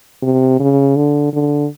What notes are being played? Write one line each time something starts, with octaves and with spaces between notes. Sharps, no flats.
C3
C#3
D3
D3